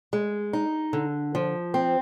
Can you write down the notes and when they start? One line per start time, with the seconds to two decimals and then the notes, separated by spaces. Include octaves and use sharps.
0.13 G#3
0.53 D#4
0.93 D3
1.35 F3
1.74 C4